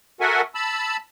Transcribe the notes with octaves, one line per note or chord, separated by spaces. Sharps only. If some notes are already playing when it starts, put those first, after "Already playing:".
F#4 A4 A#4 E5 F#5 G#5
A5 B5 E6